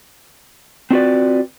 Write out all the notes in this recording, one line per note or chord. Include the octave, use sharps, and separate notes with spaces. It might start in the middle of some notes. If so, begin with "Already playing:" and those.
C4 D4 F4 F#4 B4 D5